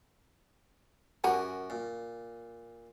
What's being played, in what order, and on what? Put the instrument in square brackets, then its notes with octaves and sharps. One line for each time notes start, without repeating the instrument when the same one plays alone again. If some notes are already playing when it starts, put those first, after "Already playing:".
[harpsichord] F#2 F#4 A#4 [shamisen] G4 F#5 G#5
[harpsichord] A#2